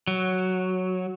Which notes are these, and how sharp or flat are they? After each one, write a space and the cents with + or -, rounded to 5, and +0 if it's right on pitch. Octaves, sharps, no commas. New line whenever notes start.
F#3 +0